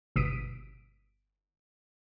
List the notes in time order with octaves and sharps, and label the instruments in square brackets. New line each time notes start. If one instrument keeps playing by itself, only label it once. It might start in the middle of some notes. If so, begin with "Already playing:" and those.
[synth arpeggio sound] G1 B2 D#6 B6 D7 D#7